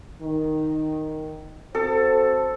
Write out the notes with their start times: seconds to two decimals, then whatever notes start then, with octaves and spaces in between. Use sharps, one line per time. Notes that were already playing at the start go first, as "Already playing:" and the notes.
0.21 D#3
1.75 C4 F#4 A4 C5